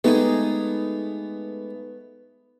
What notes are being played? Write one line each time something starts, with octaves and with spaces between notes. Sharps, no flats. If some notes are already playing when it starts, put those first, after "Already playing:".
G#3 A3 B3 D#4 G4 G#4